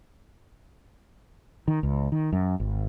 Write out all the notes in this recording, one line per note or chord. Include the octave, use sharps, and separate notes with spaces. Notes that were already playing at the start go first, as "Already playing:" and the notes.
D#3
C#2
D#3
F#2
G#1